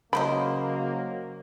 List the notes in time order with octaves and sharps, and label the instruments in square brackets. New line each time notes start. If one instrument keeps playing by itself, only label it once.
[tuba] C#3 [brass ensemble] F#3 A#3 [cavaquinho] A#4 C5 D#5 [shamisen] B5